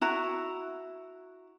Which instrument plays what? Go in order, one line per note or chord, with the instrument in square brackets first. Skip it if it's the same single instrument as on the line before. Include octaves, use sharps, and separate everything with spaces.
[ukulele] E4 F#4 A#5